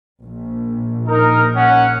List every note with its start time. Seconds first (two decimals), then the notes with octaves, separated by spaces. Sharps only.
0.22 A#1
1.08 D#4 A#4
1.55 C#4 F#5